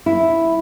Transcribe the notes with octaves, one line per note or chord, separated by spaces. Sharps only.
E4